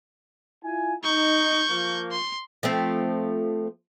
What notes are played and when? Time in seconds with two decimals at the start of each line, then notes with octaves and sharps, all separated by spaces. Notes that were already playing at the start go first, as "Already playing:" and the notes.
0.63 E4 F4 G#5
1.04 D#4 C#6 G6
1.70 F3 A#3
2.12 C6
2.63 F3 A3 C4